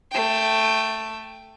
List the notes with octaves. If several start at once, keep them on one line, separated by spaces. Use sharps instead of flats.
A3 G5